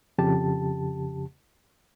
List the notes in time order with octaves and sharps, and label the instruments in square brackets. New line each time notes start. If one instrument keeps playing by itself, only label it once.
[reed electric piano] F2 C#3 G4 A5